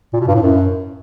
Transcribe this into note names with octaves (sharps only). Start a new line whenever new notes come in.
A#2
B2
G2
A2
F#2